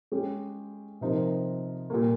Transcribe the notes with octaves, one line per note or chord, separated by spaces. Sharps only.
G#3 C#4 G4
C3 F3 C4 D#4 A#4
A#2 G3 A#3